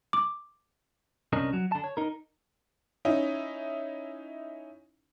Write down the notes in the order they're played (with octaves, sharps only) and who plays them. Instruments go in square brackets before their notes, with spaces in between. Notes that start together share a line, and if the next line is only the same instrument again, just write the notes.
[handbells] D6
[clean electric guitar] C2 C#4 D4 A#4 D#5
F#3
D3 A5
C#5
D#4 A#4
[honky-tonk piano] C#4 D#4 E4